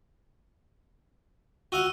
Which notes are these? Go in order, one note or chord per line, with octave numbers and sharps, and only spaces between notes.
F#4 F5 F#5 E6 D#7 G7